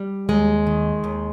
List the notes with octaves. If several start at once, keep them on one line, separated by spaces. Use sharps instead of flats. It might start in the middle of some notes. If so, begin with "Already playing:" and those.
Already playing: G3
D#2 G#3
D#3
D#2